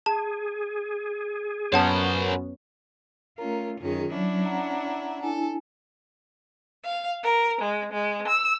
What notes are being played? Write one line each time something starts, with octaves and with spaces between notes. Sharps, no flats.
G#4 A5
F#2 B3 C#4 A#4 C5 C#5 F#5 A5
A3 C#4 F4 A#4 A#5
F#2 D#3 C#4 F4 G#4
F#3 C#4 D4 E4
F#5 A#5
D4 E4 A4 G#5
F5
A#4
G#3
G#3
E6